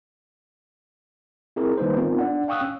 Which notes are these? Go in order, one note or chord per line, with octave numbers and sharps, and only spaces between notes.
C4 E4 G#4 A#4
D#3 G3 A#3 D#4 B4 C5
B3 C4 D#4 F4 A#4
D4 D5 F#5
F5 G5 C#6 D#6 E6 F#6
C#4